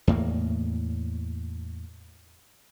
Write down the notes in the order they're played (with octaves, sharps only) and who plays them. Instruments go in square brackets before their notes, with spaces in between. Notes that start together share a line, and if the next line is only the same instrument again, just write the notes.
[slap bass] E2 A2 A#3